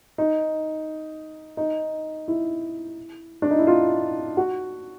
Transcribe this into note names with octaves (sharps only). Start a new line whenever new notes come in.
D#4
D#4
E4
D4
D#4
E4
F4
F#4